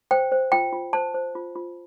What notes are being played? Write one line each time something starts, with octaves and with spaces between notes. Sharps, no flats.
C5 G5
C5
F4 G5
F4
C5 A5
C5
F4
F4